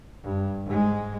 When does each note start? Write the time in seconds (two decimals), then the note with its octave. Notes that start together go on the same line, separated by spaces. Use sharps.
0.24 G2
0.65 G#2 G#3